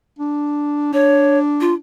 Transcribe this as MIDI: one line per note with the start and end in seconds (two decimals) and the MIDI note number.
0.19 0.93 62
0.93 1.80 62
0.93 1.38 73
1.61 1.74 65